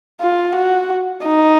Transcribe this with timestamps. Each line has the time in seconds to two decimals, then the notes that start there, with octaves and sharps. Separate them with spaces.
0.21 F4
0.56 F#4
1.26 D#4